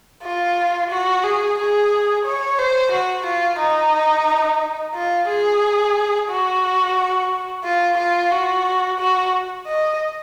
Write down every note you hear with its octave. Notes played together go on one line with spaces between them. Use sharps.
F4
F#4
G#4
G#4
C#5
C5
F#4
F4
D#4
F4
G#4
F#4
F4
F4
F#4
F#4
D#5